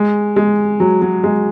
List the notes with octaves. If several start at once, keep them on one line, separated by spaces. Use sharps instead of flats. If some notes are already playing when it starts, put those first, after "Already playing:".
Already playing: G#3
G#3
F#3
F#3
G#3